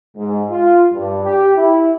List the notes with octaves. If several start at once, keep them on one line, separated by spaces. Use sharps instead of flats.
G#2
F4
G2
G4
E4